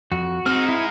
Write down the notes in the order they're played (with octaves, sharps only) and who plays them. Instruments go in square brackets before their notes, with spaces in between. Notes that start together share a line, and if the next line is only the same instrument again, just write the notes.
[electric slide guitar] F2 [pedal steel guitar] F#4
[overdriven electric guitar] G#3 D#4 [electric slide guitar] C4 [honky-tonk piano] F6
[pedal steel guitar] E4